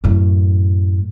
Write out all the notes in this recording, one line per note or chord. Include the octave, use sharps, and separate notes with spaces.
F#2 A2